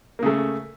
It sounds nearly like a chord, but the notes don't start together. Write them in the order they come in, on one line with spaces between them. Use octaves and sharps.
A#3 C#3 A3